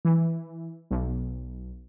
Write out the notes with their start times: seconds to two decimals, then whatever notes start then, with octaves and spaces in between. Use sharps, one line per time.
0.05 E3
0.91 B1